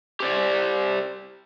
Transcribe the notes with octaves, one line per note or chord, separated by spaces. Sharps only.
G4 C5 D5